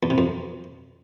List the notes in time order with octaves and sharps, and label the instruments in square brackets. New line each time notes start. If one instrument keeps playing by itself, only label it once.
[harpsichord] E2
C3
F2